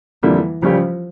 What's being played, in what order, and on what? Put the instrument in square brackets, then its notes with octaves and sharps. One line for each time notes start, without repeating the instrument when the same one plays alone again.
[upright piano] F2 D3 G3 A#3 [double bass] E3
[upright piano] C#2 C#3 G3 C#4 G4 [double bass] F3